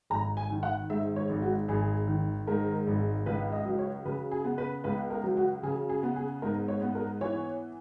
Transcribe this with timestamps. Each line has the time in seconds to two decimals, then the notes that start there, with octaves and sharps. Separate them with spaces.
0.10 G#1 A#5
0.37 G#5
0.50 D#3
0.63 F#5
0.90 G#2 E5
1.16 C#5
1.30 G#1
1.42 F#4
1.68 G#1 G#4
2.08 D#3
2.47 G#2 A#4
2.87 G#1
3.26 C#2 B4
3.52 D#5
3.66 F#3
3.79 C#5
4.05 C#3 B4
4.32 G#4
4.45 B3
4.58 B4
4.84 C#2 B4
5.10 A#4
5.24 F#3
5.37 F#4
5.63 C#3 G#4
5.90 G#4
6.03 B3
6.16 G#4
6.42 G#2 A#4
6.68 C#5
6.82 B3
6.95 A#4
7.21 E3 C#5